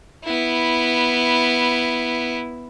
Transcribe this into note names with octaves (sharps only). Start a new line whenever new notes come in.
B3 E4